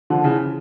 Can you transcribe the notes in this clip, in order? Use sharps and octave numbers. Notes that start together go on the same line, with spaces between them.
D3 F3
C#3 E3